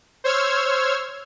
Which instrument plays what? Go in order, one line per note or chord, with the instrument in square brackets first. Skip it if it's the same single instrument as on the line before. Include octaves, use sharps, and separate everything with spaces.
[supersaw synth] C5 C#5 E6 F6 G#6